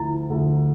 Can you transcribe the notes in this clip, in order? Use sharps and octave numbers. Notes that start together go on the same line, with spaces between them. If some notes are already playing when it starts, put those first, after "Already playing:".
Already playing: D2 D3 F3 A3 E4
D2 D3 F3 A3